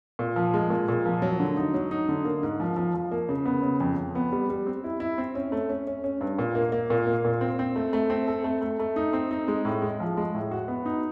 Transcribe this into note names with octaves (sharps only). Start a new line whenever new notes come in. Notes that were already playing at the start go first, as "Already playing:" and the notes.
A#2
F3
G#3
A#2
A#2
F3
F#3
D3
D#4
F#3
D#4
D3
A#3
G#2
F3
F3
F3
A#3
C#3
B3
C#3
F2
F2
B3
G3
G3
C4
E4
E4
C4
C#4
A3
C#4
C#4
C#4
G2
A#2
A#3
A#3
A#2
A#3
A#2
C4
C4
A3
A3
C4
A4
A3
A3
A3
D#4
C4
D#4
G#3
A2
G#3
F3
G#3
A2
F#4
B3
D#4